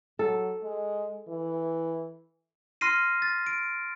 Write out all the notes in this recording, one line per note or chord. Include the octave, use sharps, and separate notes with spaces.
F#3 A4
G#3
E3
C6 F6 A#6 C7 D#7
A6
D7